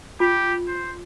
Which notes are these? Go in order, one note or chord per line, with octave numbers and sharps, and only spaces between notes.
F4 G4
C5